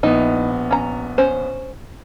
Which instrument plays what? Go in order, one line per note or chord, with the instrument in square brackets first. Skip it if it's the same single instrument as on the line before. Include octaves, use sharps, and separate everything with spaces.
[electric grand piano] A#1 B3 [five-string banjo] D#4 E4
[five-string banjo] C#4 A#5
C#4 C5